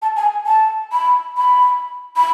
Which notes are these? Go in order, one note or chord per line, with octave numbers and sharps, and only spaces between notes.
A5
G#5
A5
B5
B5
B5